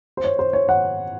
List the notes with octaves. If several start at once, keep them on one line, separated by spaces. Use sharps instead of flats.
C5
C#5
C5
C#5
F#5